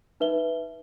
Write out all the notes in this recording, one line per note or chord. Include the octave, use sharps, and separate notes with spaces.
D#4 B4 E5 G7